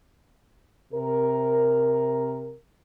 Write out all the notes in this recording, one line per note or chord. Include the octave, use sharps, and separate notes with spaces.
C3 A#4